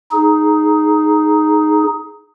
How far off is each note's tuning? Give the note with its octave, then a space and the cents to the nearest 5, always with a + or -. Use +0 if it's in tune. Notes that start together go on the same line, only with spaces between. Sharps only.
D#4 +0 G#4 +15